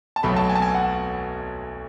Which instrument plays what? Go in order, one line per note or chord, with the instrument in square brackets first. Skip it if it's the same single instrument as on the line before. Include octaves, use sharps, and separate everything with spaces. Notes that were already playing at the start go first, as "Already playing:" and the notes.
[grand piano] A5
B1 B2 F#3 A3 B5
A5
G#5
A5
G#5
F#5